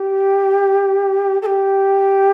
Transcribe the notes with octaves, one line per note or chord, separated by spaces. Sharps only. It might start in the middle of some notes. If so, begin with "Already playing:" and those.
Already playing: G4
A4
G4